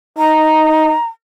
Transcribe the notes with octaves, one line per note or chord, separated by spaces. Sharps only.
D#4 A#5